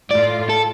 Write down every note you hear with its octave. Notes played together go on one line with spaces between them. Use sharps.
A2 A3 F4 D5
A4